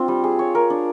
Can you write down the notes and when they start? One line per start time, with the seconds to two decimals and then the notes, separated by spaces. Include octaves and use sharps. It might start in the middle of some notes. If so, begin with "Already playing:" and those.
Already playing: C4 D4 F4
0.08 G3
0.24 G#4
0.39 C#5
0.55 A#4
0.70 D4